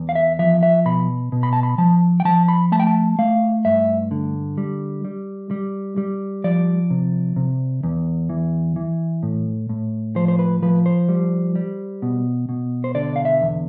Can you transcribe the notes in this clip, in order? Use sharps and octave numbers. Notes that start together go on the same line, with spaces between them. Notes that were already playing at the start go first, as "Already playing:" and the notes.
Already playing: E2
F5
E5
F3 E5
E5
B2 B5
B2
B5
A5
B5
F3 A5
G5
F3 A5
B5
A3 A5
G5
A5
A3 F5
G2 E5
D3
G3
G3
G3
G3
F3 D5
C3
C3
E2
E3
E3
A2
A2
F3 C5
C5
B4
F3 B4
C5
G3
G3
B2
B2
C5
D3 D5
F5
E5
E2